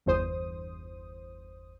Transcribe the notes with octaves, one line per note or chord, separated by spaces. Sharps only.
G1 E2 C5 D#6